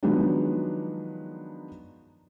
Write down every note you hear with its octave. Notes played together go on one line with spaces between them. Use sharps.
D#3 F3 F#3 G#3 B3 D4